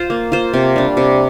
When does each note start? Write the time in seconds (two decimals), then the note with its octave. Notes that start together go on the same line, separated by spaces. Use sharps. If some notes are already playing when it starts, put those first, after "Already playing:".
Already playing: F4 C5
0.10 A#3
0.32 F4 C5
0.53 C3
0.76 G3 D4
0.97 C3